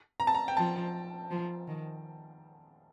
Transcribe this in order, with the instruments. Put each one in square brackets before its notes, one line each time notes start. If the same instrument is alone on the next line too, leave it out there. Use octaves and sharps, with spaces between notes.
[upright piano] A#5
A5
A#5
G5
[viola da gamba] F3 [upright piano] A5
[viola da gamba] F3
D#3